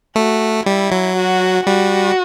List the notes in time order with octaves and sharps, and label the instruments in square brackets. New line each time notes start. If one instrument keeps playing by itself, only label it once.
[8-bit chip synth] A3 [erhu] F#4
[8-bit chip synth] G3 [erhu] E4
[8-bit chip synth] F#3
[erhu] F#4
[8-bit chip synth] G3 [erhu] F#4